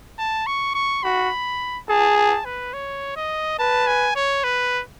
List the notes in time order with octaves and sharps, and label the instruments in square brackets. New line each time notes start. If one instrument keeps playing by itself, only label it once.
[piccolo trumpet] A5
C#6
C#6
[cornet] F#4 [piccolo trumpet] B5
[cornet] G#4 [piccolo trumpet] A5
[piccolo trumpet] A5
B4
C#5
D#5
[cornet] B4 [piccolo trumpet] A5
[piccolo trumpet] G#5
C#5
B4